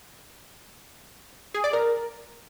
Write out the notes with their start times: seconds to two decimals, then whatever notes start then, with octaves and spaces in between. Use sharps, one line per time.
1.54 G#4
1.64 D5
1.73 A#4